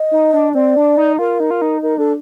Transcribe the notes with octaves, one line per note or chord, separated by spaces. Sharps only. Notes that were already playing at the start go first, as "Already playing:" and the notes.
Already playing: D#5
D#4
D4
C4 D5
D4
D#4
F4 A#4
D#4
F4
D#4
D#4 A#4
D4 A4